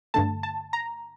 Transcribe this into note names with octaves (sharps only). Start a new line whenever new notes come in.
G2 D3 A3 A5
A5
A#5